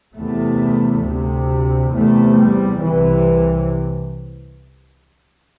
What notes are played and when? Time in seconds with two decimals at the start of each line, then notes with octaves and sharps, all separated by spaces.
0.16 E2 C3 A3
1.04 D2 C3
1.93 E2 C3 A3
2.38 G3
2.82 C2 C3 E3